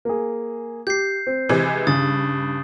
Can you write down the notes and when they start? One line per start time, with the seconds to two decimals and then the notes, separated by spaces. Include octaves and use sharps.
0.05 A#3 G#4
0.87 G4 G6 C7
1.27 C4
1.49 C3 E3 G#3
1.87 G2 C#3 D#6 A6